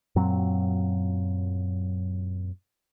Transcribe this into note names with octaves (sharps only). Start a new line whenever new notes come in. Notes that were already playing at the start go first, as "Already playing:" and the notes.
F#2 A#2 F#3 C4